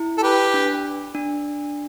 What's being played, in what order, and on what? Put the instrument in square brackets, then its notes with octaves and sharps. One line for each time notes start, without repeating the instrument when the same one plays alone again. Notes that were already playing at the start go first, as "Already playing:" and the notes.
Already playing: [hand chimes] E4
[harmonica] A4
G4 B4
[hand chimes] D4
D4